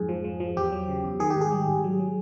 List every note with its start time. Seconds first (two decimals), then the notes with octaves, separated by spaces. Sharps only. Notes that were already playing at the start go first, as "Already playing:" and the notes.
Already playing: F2 G#2 G#4
0.09 F3
0.24 F3
0.40 F3
0.56 E2 G4
0.72 F#3
0.89 C#3
1.04 E2
1.20 D#3 G#4
1.30 G4
1.36 G#2
1.41 G#4
1.52 G3
1.67 G#2
1.84 F#3
1.99 F#3